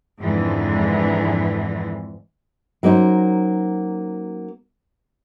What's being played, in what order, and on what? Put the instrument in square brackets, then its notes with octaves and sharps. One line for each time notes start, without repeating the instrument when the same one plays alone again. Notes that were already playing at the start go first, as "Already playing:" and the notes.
[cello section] F2 G#2 D3 E3
[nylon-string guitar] F#3 A#3 C#4 D#4 C5